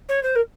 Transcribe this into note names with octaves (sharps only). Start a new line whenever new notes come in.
C#5
C5
A#4